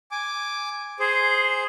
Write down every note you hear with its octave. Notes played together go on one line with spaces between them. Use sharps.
G#5 D6
G#4 C5